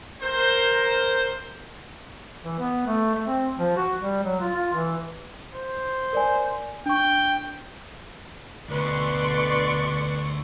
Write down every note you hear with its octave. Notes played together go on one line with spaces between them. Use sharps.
A#4 C5
E3
B3
A3
A3
C4
F3
F#4
G3
F#3
F4
F4
E3
C5
A#4 D5 G#5
D4 G5 C#6
D2 B2 D3 B4 D5 C6 C#6